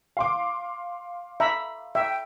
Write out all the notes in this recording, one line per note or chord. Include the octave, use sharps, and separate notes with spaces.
F5 C6 D6
E5 A#5 B5
E5 G5